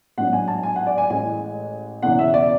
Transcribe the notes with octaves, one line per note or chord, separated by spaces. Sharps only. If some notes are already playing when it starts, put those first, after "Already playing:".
A1 G#2 F#3 B3 D4 F#5
G#5
A5
G#5
F#5
D5
G#5
A1 A2 G#3 G#5
E1 E2 C#3 E3 F#5
E5
D5